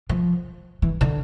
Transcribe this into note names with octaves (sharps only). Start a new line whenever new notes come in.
F3
E3
D3